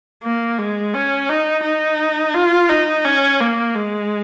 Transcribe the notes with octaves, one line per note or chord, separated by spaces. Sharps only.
A#3
G#3
C#4
D#4
D#4
F4
D#4
C#4
A#3
G#3